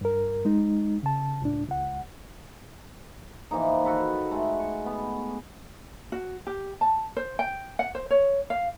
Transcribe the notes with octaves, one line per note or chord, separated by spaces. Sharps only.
G2 A#4
G#3 D#4
C#3 A5
C#2 A2 D4
C#2 F#5
E3 F3 A#3 D#4
D#3 F#4 A4 B4
G#3 A3
C#6
B3
F#4
G4
A5
C5
G5
F#5
C5
C#5
F5